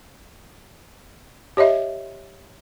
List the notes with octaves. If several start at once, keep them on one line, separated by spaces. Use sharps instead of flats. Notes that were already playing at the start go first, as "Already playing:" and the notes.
G4 C#5 D#5 E5